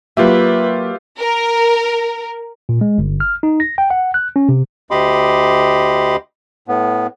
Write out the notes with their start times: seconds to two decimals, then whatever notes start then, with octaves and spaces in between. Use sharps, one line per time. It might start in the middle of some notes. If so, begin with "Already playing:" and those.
0.17 F#3 A#3 F4 G4 B4 E5
1.19 A#4
2.69 A#2
2.81 G#3
2.98 G1
3.20 F6
3.43 D#4
3.60 A#6
3.78 G5
3.90 F#5
4.14 F#6
4.36 C#4
4.49 C3
4.91 D2 G4 D#5 B5 C6 D6
6.68 A2 B3